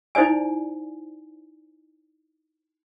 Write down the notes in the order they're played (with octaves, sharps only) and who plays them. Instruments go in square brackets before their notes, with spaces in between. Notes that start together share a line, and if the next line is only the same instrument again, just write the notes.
[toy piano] D#4 E4 C5 D5 G#5